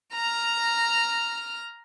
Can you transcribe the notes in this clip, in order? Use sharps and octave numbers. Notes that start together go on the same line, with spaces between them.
A#5 F6